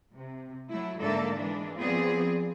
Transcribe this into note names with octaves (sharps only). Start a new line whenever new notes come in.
C3
F#3 A3 E4
G#2 D3 A#3 A4 D5 E5
E3 G#3 D4
F3 B3 C4 F4 G#4 D5